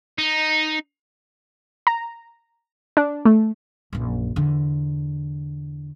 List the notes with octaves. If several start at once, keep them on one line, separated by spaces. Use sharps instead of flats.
D#4
A#5
D4
A3
A#1 F#2
E2 D3